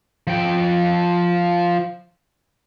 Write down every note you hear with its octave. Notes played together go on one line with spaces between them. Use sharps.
F3 G5